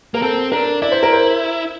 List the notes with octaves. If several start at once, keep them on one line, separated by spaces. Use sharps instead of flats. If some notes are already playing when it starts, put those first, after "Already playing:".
A#3 A#4
C4 A4
D4 A#4
E4 D5
C5
A#4
C5